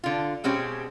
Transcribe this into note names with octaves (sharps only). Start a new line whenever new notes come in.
D3 F4
B2 G#3 C4 C#4 G4